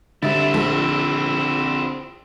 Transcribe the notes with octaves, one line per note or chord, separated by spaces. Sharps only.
D3 G3 C4 E4 E5 A6
A#1